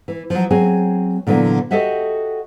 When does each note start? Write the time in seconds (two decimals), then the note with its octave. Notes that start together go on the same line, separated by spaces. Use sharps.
0.08 E3
0.30 F3 F#3
0.51 F#3 C4 G#4 G#5
1.27 A#2 D3 E3 F#3 B3
1.71 F#4 G4 A4 D#5 E5 F#5